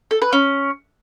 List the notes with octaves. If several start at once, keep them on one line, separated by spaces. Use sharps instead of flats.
A4
B4
C#4